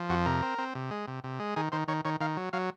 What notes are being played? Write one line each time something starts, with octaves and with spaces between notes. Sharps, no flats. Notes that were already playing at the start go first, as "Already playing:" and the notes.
Already playing: F3
F2 F#4
C3 A#4
C4
C4
C3
G#3
C3
C3
G#3
D#3 G#4
D#3 C5
D#3 C#5
D#3 C#5
D#3 F5
F#3
F#3 F5